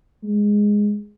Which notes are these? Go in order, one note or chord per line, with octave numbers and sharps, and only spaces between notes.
G#3